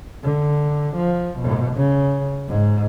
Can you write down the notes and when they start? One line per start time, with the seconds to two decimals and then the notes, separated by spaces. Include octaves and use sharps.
0.23 D3
0.96 F3
1.39 B2
1.76 C#3
2.48 G#2